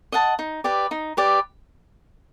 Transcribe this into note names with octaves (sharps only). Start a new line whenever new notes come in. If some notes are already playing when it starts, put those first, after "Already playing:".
D#5 F#5 A5
D#4
G4 B4 D5
D#4
G4 B4 D5